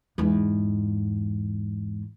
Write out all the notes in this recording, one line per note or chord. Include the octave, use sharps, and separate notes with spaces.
E2 G#2